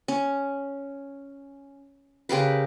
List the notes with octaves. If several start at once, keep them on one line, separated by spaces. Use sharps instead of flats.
C#4
C#3 G4 A#4 B4